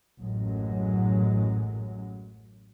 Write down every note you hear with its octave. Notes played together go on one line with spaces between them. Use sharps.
A1 F#2 F#3 G#3